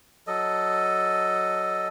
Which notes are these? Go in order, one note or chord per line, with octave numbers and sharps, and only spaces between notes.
F#3 A4 D#5